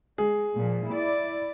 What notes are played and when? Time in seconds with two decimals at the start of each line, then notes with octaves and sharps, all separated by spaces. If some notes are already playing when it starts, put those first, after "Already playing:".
0.18 G#3 G#4
0.55 A#2 F3
0.87 E4 D5